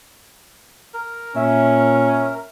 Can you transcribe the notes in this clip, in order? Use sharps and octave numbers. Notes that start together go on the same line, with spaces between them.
A#4
A#2 C#4 E5